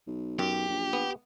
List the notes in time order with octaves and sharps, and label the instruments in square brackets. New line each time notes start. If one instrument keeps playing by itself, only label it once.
[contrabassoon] B1
[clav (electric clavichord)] F#2 [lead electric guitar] G4
[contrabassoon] A#1
[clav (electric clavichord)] B3